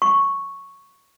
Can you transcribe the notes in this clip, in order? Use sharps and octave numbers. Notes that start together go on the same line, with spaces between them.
C#6